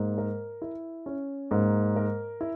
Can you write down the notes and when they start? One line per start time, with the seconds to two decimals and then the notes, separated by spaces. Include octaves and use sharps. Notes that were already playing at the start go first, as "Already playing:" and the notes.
Already playing: G#2 A#3
0.18 A#4
0.62 E4
1.06 C#4
1.51 G#2 A#3
1.96 A#4
2.41 E4